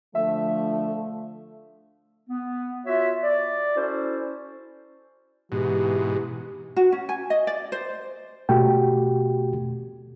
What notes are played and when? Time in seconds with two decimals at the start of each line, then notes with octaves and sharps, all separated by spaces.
0.15 D3 F3 A3 E5
2.30 B3
2.86 F4 F#4 C#5 E5
3.23 D5
3.76 C#4 E4 F#4 A4 C5
5.52 G#2 B2 E3 G4
6.76 F#4
6.92 C#4
7.09 G#5
7.30 D#5
7.47 D5
7.72 C5
8.49 B2 A3 F#4 G4 G5